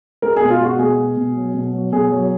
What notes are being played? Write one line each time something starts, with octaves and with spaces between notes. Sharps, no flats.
G#3 A#4
B2 G#4
F4
G#3 F#4
B2 G#4
G#3
B2
F#3
B2
F#3
B2 G#4
F#3